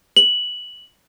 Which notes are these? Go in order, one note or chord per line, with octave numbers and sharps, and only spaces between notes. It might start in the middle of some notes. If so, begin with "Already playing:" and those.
F#7